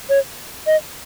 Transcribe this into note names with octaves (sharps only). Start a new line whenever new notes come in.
C#5
D#5